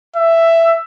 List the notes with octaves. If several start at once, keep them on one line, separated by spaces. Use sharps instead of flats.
E5